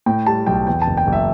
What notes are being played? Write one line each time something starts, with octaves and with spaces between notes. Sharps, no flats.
A2 G5
G3 A5
B1 G5
E2 G5
A5
F#1
G5
F#1
E5